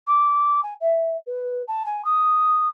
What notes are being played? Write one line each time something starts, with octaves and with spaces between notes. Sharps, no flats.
D6
G#5
E5
B4
A5
G#5
D#6